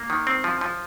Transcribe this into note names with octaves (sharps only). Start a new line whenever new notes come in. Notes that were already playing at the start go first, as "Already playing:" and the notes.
Already playing: A#3
D#3
C4
F3
F3